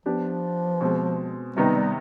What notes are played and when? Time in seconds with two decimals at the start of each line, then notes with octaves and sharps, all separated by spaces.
0.05 F3 B3 D4 G4
0.81 B2 G#3 C4
1.56 C3 D#3 G3 B3 D#4
1.75 G3